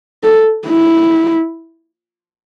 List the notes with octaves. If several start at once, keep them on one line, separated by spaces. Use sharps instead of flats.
A4
E4